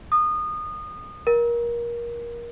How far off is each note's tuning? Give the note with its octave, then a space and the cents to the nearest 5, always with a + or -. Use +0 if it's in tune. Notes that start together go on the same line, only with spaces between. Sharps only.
D#6 -25
A#4 +25